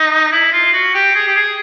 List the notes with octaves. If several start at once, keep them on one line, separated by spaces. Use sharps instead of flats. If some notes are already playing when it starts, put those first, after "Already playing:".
Already playing: D#4
E4
F4
F#4
G4
G#4
G4
G#4